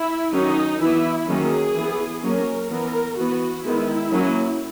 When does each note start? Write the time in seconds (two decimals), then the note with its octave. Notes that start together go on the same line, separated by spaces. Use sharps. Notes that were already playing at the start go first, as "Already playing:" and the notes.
Already playing: E4
0.34 D#3 F#3 C#4 D#4
0.81 E3 B3 E4
1.29 D#3 F#3 A#3 C#4 G#4
1.76 E3 B3
2.23 F#3 A#3 C#4 A#4
2.70 E3 B3 A#4
3.18 E3 B3 F#4
3.66 D#3 G#3 B3 E4
4.12 F#3 A#3 C#4